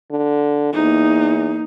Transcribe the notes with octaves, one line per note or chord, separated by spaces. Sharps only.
D3
E2 A#3 D#4